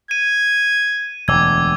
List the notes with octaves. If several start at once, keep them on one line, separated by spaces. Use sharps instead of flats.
G#6 D#7
E1 D2 D6 E6 G#6